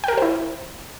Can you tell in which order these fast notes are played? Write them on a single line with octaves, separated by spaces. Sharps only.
G5 A#4 G4 C5 E4